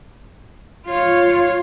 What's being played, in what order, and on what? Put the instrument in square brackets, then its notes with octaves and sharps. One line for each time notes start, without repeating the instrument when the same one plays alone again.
[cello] F4 C#5